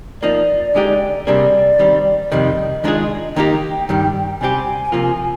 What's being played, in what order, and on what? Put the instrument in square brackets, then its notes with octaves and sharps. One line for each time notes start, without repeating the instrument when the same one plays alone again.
[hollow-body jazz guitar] F3 A#3 D#4 [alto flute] D5
[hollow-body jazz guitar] D3 G#3 D#4 G4
[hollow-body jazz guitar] C3 G3 A#3 D4 G#4 [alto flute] D5
[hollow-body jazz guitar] D#3 G3 C4
[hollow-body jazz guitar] F2 C3 D#3 G3 [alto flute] D#5
[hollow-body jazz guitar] D#3 G#3 D4 F4 G#4
[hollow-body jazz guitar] D#3 A#3 D#4 G4 [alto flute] G5
[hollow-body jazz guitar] G2 D#3 G3
[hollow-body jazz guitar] C3 G3 C4 G4 [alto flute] G#5
[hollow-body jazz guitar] C3 F3 A#3 F4